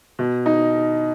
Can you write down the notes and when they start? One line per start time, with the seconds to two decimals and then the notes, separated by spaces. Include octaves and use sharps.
0.19 B2
0.46 D#4